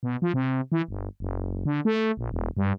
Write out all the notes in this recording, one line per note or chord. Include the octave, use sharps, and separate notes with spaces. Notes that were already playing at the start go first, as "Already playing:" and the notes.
B2
F3
C3
E3
G1
F#1
D3
A3
A#1
E1
G2